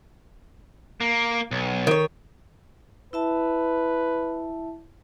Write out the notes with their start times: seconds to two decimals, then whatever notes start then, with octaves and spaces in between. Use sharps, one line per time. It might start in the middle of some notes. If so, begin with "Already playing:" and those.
1.01 A#3
1.51 B1
1.87 D#3 C#5
3.13 E4 B4 E5 A5